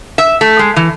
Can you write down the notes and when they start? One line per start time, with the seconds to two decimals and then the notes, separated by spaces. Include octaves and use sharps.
0.18 E5
0.41 A3
0.59 G#3
0.76 E3